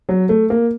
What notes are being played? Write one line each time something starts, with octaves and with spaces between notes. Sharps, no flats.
F#3
A3
A#3